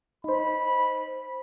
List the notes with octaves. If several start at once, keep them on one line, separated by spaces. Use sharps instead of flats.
D#4 C5 B5